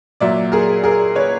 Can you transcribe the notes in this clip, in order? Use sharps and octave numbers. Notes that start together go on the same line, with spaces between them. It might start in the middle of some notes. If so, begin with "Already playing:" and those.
A#2 F#3 D5 E5
G#4 A#4
G#4 A#4
B4 C#5